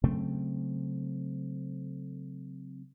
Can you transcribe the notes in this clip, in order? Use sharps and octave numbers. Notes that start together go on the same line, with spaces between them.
C#3 F#3 A3 C4